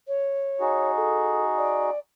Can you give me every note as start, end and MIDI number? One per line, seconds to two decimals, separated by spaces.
0.07 0.91 73
0.60 1.90 63
0.60 1.90 66
0.60 1.90 68
0.96 1.43 69
1.57 1.98 74